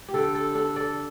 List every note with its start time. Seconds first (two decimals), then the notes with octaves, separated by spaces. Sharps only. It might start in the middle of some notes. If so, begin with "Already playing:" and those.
0.08 G4
0.14 D3 A4
0.35 A4
0.55 D4 A4
0.76 A4 D5